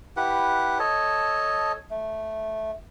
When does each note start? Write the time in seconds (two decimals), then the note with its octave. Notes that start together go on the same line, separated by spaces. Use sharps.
0.17 E4 G4 B4 F#5
0.79 A4 C#5 D#5 A5
1.90 A3